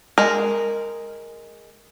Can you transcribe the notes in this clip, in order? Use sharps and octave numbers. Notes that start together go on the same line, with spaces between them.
G#3 A#4